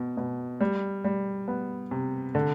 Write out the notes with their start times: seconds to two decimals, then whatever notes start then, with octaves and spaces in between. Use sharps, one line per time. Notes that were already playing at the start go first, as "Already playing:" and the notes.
Already playing: B2
0.17 B2
0.61 G3
1.04 G3
1.48 B3
1.91 C3
2.35 D3